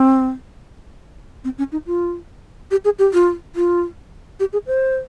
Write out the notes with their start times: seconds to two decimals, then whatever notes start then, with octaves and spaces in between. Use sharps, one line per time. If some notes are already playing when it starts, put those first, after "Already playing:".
Already playing: C4
1.44 C4
1.58 C#4
1.72 D#4
1.86 F4
2.71 G4
2.85 G#4
2.99 G4
3.14 F4
3.56 F4
4.40 G4
4.53 G#4
4.67 C5